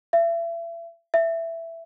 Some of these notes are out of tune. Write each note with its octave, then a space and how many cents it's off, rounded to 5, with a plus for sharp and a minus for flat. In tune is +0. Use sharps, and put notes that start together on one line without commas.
E5 +35
E5 +10